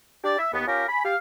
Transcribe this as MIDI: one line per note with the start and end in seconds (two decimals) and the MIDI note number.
0.24 0.37 62
0.24 0.37 67
0.24 0.37 74
0.39 0.50 76
0.54 0.67 39
0.54 0.67 59
0.67 0.85 61
0.67 0.85 65
0.67 0.85 67
0.67 0.85 70
0.89 1.01 80
0.89 1.01 83
1.05 1.15 67
1.05 1.15 77